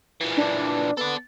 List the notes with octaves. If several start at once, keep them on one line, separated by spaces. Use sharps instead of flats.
A#2 E3
D4
B3 A4 D5